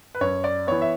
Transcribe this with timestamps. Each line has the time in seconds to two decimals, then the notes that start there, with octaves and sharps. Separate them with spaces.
0.15 B4
0.21 F#2 C#5
0.44 D5
0.67 E3 B3 C#5
0.82 E5